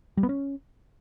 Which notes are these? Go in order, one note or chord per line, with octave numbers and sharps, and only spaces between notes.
G3
B3
C#4